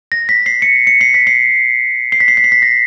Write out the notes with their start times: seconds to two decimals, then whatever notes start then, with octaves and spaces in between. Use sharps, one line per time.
0.12 A#6
0.29 B6
0.46 C7
0.62 C#7
0.87 C#7
1.01 C7
1.14 B6
1.27 C7
2.12 C7
2.20 B6
2.28 C7
2.37 B6
2.44 C7
2.52 B6
2.62 A#6